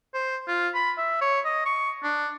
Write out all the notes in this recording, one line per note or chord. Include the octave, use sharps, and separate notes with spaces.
C5
F4
B5
E5
C#5
D#5
C#6
D4